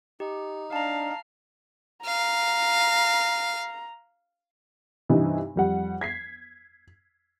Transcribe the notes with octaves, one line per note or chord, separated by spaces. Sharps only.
D#4 G4
D4 F5 A5 A#5
F5 A#5
G2 C3 E3 D#4
F2 G3 F#5
G#6 B6 C7